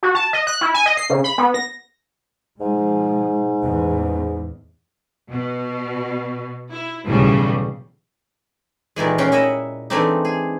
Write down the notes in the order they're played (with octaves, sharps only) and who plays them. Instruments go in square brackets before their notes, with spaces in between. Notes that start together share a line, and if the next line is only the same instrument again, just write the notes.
[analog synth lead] F#4
A5
D#5
F#6
E4
G#5
D#5
C7
C#3
B5
B3
A#6
[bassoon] G#2 [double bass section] B2 F3 G#3
[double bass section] A1 E2
[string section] B2
E4
B1 E2 A2 C#3 G3
[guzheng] A#2 D#3 E3 G#3
C#4 D#4 C#5 F#5 G5 C6
E4 D#5 E5 F#5
E3 G#3 A3 C4 D4 D#4
G#4